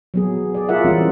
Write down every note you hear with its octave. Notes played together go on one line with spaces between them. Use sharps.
F#3 B3 G#4
G#4 D5
F4 G#4 A#4 D5 E5 F#5
E3 G3 C4 C#4